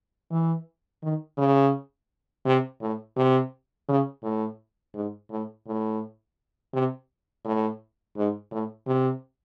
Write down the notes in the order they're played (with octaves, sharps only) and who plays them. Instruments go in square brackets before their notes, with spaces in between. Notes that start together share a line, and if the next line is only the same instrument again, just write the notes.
[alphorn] E3
D#3
C#3
C3
A2
C3
C#3
A2
G#2
A2
A2
C3
A2
G#2
A2
C3